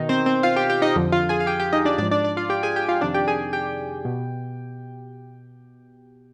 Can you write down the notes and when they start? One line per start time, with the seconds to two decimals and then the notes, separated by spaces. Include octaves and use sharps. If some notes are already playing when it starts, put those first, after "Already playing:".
Already playing: B2 D#3 D#4
0.09 C4 C5
0.26 C4 C5
0.43 F4 F5
0.56 G4 G5
0.70 G4 G5
0.82 D#4 D#5
0.96 F2 D3 F3
1.12 F4 F5
1.29 G#4 G#5
1.40 F5
1.46 G4 G5
1.60 G4 G5
1.73 D#4 D#5
1.85 D4 D5
1.98 G#2 F3 D4 D5
2.11 D4 D5
2.24 D4 D5
2.37 F4 F5
2.50 G4 G5
2.63 G#4 G#5
2.76 G4 G5
2.89 F4 F5
3.01 F2 C3 D#3 D4 D5
3.14 G4 G5
3.28 G#4 G#5
3.53 G4 G5
4.05 B2